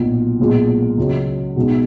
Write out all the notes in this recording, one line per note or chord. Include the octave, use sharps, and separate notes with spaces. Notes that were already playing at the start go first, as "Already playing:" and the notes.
Already playing: B1 A#2 F#3
B1 A#2 G#3
C#2 C#3 F#3
B1 B2 G#3 B3 D#4